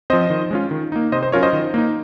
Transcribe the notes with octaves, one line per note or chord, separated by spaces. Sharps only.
F3 C4 C5 D#5
D#3
G#3 C#4 F4
D#3
A#3 D#4
C3 C5 D#5
C5
F#3 C#4 F4 A#4 C#5
C5 D#5
D#3
A#3 D#4